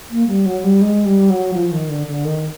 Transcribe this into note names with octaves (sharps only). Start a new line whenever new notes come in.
A#3
G3
F#3
G3
G#3
G3
F#3
F3
D#3
D3
D3
D#3